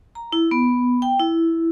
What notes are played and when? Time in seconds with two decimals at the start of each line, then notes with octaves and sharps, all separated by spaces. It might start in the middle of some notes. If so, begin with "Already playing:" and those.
0.15 A#5
0.32 E4
0.51 B3
1.02 G5
1.19 E4